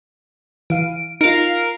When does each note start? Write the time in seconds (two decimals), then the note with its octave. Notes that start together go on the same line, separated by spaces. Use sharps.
0.70 E3 F5 D7 D#7
1.21 D#4 F4 A#4 F5